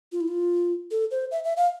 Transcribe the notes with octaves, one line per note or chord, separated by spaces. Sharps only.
F4
E4
F4
A4
C5
E5
E5
F5